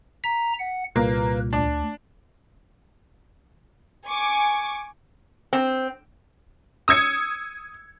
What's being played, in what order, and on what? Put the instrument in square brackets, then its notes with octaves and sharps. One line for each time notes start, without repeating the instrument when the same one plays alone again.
[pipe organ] A#5 [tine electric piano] B6
[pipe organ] F#5
[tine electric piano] C2 A#2 [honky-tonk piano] A#3 [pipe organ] B4
[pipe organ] D2 [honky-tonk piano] D4
[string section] G#5 C#6 D6
[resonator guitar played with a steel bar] C4
[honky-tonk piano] D#6 E6 G#6 C#7